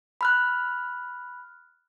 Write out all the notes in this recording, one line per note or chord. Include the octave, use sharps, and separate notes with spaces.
B5 F6 F#6